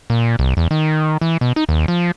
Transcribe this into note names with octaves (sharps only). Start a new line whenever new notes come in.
A#2
C2
E2
D#3
E3
B2
D#4
D#2
F3